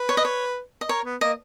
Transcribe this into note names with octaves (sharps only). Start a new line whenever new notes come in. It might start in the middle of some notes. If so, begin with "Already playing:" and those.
Already playing: B4
C#5
D#5
C#5
D#5
A#4 C#5
B3
A#3 D#5